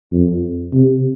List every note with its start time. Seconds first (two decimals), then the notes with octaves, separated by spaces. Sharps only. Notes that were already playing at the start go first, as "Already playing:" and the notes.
0.12 F2
0.73 C3